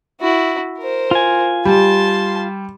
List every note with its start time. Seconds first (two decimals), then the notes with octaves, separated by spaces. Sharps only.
0.21 E4 F#4
0.79 A#4 C5
1.11 F4 G#5
1.65 G3 A5 C6